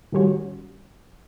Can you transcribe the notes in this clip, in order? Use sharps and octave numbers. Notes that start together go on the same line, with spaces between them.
A2 D#3 G3 C#4 F#4